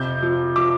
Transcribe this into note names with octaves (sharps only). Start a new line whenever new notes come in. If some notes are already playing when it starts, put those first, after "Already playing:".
Already playing: F2 C3 G6
F3
F3 D6